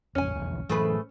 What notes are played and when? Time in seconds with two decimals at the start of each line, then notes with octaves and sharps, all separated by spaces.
0.15 A1 F2 C#4 G#5
0.35 F1 B1 E2
0.70 A2 E3 F#3 A3 G#4 B4